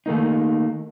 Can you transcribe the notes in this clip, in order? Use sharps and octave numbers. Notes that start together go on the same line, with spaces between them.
D#3 A3 A#3 D#4